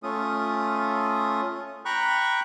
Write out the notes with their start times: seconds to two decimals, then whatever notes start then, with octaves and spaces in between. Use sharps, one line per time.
0.03 A3 C#4 F4 D#6
1.85 G5 A#5 B5 C#6 F#6